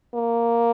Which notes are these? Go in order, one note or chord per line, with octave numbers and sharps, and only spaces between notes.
A#3